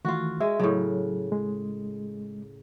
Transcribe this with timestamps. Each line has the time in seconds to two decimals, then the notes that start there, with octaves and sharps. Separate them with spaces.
0.05 D#3 E3 A3 F4 F#4
0.40 G#3 E5
0.60 A2 C#3 F#3
1.32 G#3